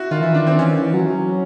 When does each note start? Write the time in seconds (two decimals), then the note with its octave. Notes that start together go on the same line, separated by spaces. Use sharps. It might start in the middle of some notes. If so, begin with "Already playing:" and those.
Already playing: E4 F#4
0.11 D#3 F4
0.22 E3 E4
0.33 D#3 D4
0.47 C4
0.59 E3 C#4
0.71 D#3
0.82 E3
0.94 F#3
1.06 F#3